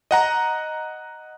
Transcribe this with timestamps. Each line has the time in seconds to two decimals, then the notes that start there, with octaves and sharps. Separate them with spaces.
0.11 D#5 F#5 A#5